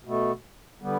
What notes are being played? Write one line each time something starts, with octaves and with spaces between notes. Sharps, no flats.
B2 A3
D3 G3 B3